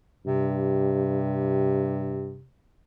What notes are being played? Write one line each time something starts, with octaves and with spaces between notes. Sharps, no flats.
G2 C3